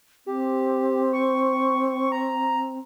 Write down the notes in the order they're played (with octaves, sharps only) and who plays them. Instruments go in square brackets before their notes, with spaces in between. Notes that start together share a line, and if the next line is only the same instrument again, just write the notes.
[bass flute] C4 [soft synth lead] G4
[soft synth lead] C#6
A#5